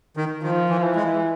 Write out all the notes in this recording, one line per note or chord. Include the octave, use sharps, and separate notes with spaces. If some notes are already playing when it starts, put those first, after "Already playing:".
D#3
D#3 F3
E3
E3
G#3